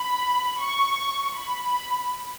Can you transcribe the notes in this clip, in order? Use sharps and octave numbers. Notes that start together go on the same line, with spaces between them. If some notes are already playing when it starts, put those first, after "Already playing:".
Already playing: B5
C#6
B5